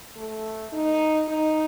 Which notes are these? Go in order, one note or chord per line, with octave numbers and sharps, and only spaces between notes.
A3
D#4
D#4